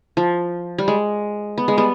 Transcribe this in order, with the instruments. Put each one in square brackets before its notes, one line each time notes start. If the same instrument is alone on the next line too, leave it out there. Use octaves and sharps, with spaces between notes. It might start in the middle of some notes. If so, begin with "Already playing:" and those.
[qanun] F3
G3
G#3
B3
G#3
G3 B3